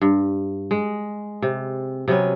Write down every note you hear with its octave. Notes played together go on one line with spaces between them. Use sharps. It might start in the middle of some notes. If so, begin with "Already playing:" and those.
G2
G#3
C3
C3 F#3 B3 C#4